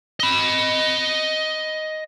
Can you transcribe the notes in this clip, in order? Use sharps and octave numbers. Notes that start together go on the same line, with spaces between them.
D#5 B5